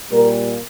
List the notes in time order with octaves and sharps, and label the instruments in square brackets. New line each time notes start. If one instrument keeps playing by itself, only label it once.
[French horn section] A#2 G3 A#3 A#4